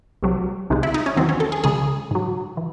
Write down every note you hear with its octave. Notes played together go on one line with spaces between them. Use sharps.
C2 C3 F#3
C2 C3 D#3 G#3
E4
D#4
C#4
E2 D#3 F#3 C4
C#4
A4
G#4
C#2 C#3 G#3 G#4
G#2 F#3
E3